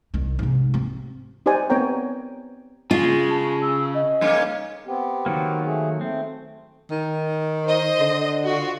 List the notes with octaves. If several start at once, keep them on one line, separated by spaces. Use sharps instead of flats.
C2 D#3
G#2 C3
C4
D#4 G4 C5 D5 G#5
B3 C4 A#4 C#5 G5 A#5
C#3 G#3 F4
A5
E6
D#5
G2 A#3 C#4
B3 C4 G4
D#3 F#3 A#3
A3 G#4
A3 C4
D#3
C5 D#5
D3
F4 F#4